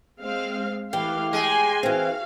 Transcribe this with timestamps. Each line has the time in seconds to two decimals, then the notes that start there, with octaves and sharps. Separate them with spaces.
0.21 G#3 C4 F5
0.93 E3 A3 G4 F5
1.33 G#3 G5 G#5 C6
1.83 E3 C4 F#4 F5